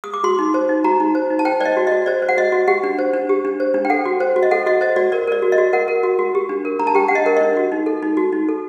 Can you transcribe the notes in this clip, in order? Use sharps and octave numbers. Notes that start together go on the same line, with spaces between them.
D#6
D6
F#4 C6
D#4
C5
D#4
F#4 A#5
D#4
C5
D#4
A5
C5 G5
C5 D5 D#5
F#4
D#5
F#4
C5 D5
C5
F#5
F#4 D#5
F#4
G4 F#5
D4
C5
D4
G4
D4
C5
D4
G5
A4 F#5
F#4
C5
F#4
D#5
A4 F#5
F#4 D#5
C5 D#5
F#4 D5
A#4 D5
A#4 D5
F#4
D#5
F#4
A#4 F#5
A#4
F#4
F#4
G4
D4
A#4
D4 A#5
A5
G4 G5
F#5
D4 D#5
A#4
D4 D#5
F#4
D#4
A4
D#4
F#4
D#4
A4